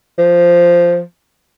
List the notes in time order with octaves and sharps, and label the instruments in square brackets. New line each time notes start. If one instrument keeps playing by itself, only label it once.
[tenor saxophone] F3